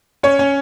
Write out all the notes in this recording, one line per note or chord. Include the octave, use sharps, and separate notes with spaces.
C#4 C#5
C#4